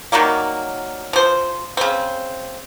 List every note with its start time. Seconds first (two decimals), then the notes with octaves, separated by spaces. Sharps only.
0.12 D#3 F#3 G3 A#3
1.13 F3 C5
1.77 C#3 C4